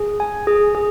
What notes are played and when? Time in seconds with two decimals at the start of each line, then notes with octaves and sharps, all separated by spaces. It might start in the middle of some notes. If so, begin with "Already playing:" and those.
Already playing: G#4
0.20 G#5
0.47 G#4
0.75 G#4